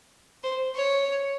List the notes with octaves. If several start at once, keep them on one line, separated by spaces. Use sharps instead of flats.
C5
C#5